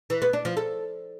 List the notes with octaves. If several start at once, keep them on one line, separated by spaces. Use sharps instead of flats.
E3
B3
D4
F3
A4